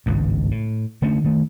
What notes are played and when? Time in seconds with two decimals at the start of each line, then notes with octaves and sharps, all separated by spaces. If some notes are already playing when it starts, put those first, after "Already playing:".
0.06 G#1 C#2 G2
0.51 A2
1.02 D3 A3 C#4
1.24 D#3 A3